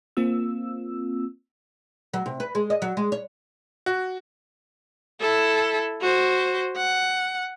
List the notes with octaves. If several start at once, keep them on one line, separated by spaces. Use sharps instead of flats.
A#3 C4 F4 E6
F#3
C3
B4
G#3
D#5
F#3
G#3
C#5
F#4
E4 A4
F#4 C5
F#5